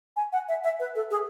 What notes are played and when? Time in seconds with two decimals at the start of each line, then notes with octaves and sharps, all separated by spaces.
0.16 G#5
0.32 F#5
0.48 E5
0.64 E5
0.80 B4
0.95 A4
1.11 G#4